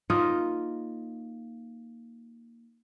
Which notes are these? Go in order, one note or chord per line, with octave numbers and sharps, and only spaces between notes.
A#3 D#4 F4 D#5